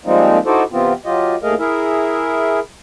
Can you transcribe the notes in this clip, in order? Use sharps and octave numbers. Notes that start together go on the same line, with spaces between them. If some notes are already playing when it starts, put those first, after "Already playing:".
F3 G3 G#3 A#3 C4 D#4
D#4 E4 F#4 A4 C5 D5
C3 E3 B3 C4 F4
F#3 F4 G4 D#5
D#2 A3 G#4 A#4 D#5 F5
E4 G#4 A#4 E5